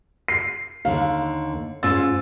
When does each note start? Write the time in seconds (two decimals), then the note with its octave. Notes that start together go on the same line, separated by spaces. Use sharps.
0.28 C7
0.85 D#2 D3 F5
1.83 G#2 C#4 F4 E6 A6